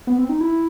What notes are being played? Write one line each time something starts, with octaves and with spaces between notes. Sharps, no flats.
B3
C4
D#4
E4